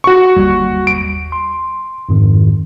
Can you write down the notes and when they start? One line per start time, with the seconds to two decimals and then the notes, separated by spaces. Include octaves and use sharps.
0.04 F#4 C#6
0.36 G1 D#2 G3
0.87 D7
1.32 C6
2.09 F2 G#2 D#3